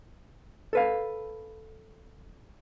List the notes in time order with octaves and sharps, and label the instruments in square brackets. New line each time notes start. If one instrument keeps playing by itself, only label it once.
[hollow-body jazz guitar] A4 B4 F5